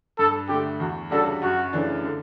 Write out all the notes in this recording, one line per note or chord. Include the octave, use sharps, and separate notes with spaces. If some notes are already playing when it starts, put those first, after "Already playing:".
G2 A4
D3 A3 G4
E2 F#4
C#3 G3 D4 F#4 A4
F#2 F#4
C#3 E3 A3 D4
D3